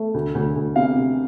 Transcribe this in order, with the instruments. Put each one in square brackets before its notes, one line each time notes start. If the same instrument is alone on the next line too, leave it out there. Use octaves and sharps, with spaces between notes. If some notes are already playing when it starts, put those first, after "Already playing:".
Already playing: [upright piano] A3
D2
D2
D2
C3 F5
C3